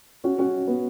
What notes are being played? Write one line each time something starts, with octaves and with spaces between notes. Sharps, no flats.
C#4 F#4
C#4 F#4
B3